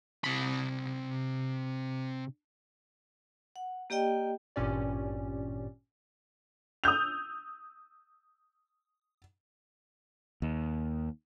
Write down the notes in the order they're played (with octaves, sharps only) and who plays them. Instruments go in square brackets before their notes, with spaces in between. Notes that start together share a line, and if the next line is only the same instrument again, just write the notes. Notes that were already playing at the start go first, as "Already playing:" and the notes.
[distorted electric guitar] C3 B5
[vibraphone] F#5
A#3 G4 D5 D#5 G5
[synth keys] G#1 G2 A#2 C#4 G4 D5
[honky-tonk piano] D#6 E6 G6 F7
[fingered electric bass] D#2